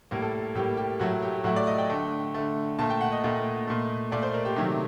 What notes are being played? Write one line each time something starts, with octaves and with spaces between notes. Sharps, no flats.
A2 G3 A#3 A#4
A4
A2 G3 A#3 G4
G4
A2 F#3 A3 F#4
G4
G4
A2 F#3 A3 F#4
D5
D#5
G5
D3 A3
D3 A3
A#2 A3 A5
G5
F#5
D#5
A#2 A3
A#2 A3
A#2 A3 D5
C5
A#4
G4
C3 D#3 F#3 A3 G4